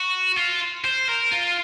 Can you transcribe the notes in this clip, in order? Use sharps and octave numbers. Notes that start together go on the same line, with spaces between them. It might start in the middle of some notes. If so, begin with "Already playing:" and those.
Already playing: F#4
F4
C5
A#4
F4